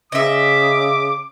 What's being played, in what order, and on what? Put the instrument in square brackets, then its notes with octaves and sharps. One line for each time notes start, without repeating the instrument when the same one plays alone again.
[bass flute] C#3 [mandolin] D#5 E5 [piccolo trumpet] D6